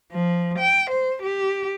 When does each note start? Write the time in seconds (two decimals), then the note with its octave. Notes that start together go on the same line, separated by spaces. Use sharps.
0.12 F3
0.59 G5
0.91 C5
1.23 G4